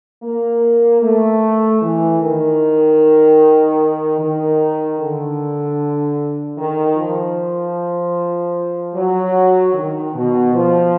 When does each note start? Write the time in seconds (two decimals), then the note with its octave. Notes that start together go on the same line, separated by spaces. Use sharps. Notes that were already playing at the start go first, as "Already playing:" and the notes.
0.23 A#3
1.02 A3
1.82 E3
2.21 D#3
4.19 D#3
4.99 D3
6.58 D#3
6.97 F3
8.95 F#3
9.74 D#3
10.15 B2
10.54 F3